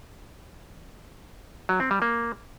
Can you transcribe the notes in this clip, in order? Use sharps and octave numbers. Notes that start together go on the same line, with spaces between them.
F#3
C4
G3
A#3